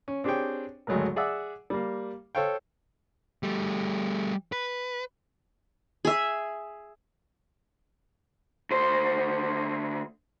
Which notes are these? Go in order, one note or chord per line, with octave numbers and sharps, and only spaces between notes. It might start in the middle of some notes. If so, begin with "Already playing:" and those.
C#4
C4 D4 G4 G#4 C#5 G5
G#1 D2 F#3 G#3 A3 A#4
G#4 D5 E5 F#5 E6
G3 A#3
A4 C5 C#5 F5 G5
G3 A3
B4
G#4 E5
D2 C5